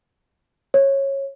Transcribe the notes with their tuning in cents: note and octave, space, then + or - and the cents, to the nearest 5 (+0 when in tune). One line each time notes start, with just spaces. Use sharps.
C#5 -20